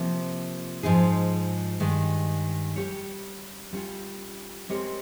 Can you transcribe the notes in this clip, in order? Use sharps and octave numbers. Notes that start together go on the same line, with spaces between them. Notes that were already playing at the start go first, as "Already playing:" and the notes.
Already playing: C3 F3 A#3
G#2 F3 G#3 D#4 G#4
G2 D#3 G#3
G3 C#4 G4 C#5
G3 C#4 F4
G#3 C4 G4 A#4 C#5